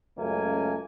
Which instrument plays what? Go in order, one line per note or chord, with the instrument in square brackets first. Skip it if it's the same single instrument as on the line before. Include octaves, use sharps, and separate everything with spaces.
[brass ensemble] C#2 F#2 A3 A#3 G#5